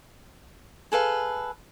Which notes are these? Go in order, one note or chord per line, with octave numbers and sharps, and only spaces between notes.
G#4 A4 B4 F5